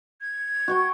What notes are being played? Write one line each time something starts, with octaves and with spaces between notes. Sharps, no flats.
G#6
F#4 G5 C#6